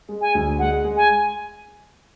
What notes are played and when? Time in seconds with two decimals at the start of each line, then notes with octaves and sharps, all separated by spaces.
0.09 G#3
0.21 G#5
0.34 D2
0.59 G#3 F#5
0.84 G#3
0.97 G#5